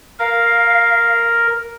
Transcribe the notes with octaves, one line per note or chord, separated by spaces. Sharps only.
A#4 F5